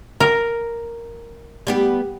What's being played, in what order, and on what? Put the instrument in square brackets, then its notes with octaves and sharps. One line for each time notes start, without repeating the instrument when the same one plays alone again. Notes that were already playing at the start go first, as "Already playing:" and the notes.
[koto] A#4
[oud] G3 B3 G4